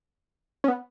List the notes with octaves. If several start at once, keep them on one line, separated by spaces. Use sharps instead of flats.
C#4
B3